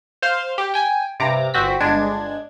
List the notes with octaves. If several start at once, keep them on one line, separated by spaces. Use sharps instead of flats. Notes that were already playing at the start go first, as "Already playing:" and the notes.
C5 F5 C6
G4
G5 G#5
G2 C3 A#5 D6
G1 C4 F#4 B6
G1 G#3 D4 G#6